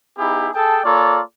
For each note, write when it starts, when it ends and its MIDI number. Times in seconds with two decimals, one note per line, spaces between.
0.18 0.49 59
0.18 0.49 63
0.18 0.49 64
0.18 0.49 67
0.18 0.49 68
0.53 0.83 68
0.53 0.83 69
0.53 0.83 79
0.53 0.83 81
0.84 1.21 58
0.84 1.21 65
0.84 1.21 69
0.84 1.21 73
0.84 1.21 74
0.84 1.21 82